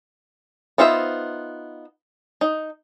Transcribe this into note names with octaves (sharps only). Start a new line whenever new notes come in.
B3 D#4 F4 C5 E5
D#4